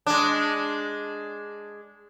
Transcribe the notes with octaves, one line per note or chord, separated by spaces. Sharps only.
G#3 D4